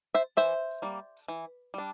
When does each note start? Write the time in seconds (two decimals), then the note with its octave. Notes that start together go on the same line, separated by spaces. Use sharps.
0.14 C5 E5
0.37 E3 C5 E5
0.82 G3 A#3
1.28 E3
1.74 G3 D4